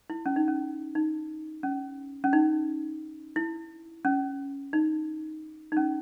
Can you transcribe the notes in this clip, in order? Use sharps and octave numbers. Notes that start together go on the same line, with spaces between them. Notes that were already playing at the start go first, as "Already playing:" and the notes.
E4
C#4
D#4
C#4
D#4
C#4
C#4
D#4
E4
C#4
D#4
D#4
C#4